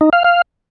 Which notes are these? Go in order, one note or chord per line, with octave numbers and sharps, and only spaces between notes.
D#4
F5
F5